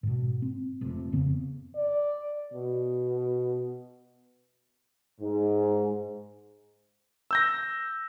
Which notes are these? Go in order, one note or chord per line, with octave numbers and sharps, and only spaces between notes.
G#2 B2
C4
F1 F2 C3
F2 C#3 B3 C4
D5
B2
G#2
E6 G6 A#6